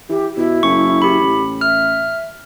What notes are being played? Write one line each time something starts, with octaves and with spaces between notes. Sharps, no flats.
E3 G4
B2 E4
F#1 C#6
G4 B5
A1
E5 F6